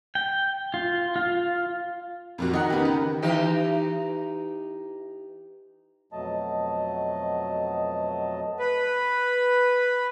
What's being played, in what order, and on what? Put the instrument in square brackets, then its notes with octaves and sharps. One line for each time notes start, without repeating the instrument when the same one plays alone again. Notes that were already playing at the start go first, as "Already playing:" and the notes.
[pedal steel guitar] G5
F4
F4
[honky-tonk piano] F2 A#2 F#4
[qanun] D#3 [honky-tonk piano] D#5 F#5 A#5
[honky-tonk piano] C#3 B3 G4
[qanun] B4
[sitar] E3 D#4 G4
[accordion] F2 B2 F#3 A3 D#5 A5
B4